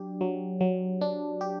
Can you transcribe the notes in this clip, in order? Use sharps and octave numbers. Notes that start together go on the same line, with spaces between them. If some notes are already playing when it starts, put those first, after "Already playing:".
Already playing: F#3 D4 G4
F#3
F#3
D4
G4